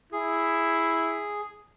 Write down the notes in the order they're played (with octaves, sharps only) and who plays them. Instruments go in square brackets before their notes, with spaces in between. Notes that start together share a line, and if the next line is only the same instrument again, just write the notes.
[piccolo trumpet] E4 [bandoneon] G#4